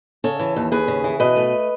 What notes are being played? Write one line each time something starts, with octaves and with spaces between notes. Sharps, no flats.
C#3 A4 C#5
E3
D#2
D#2 G#4 B4
C#3
E3
B2 B4 D#5
A3